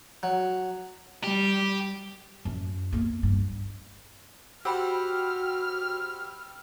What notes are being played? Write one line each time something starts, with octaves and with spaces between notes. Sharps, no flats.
F#3
G3 G4
F#2 A2
A#3 B3
G2
F#4 G4 C5 F#5 G5 B5 E6 F6